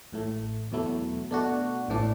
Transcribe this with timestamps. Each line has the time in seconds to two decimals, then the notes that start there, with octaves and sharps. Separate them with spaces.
0.12 A1 A2 A3
0.72 E2 B2 F#3 A3 E4
1.31 B2 A3 D4 F#4
1.88 A1 A2 E3 D4